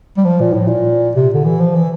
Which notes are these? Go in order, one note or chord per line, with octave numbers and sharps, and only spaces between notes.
G3
F3
A#2
A2
A#2
C3
D3
E3
F3
E3